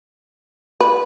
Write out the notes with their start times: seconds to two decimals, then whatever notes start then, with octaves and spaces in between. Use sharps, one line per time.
0.80 B4